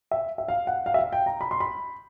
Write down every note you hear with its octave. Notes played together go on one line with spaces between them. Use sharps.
E5
E5
F5
F#5
F5
E5
F5
G5
A#5
B5
C6
B5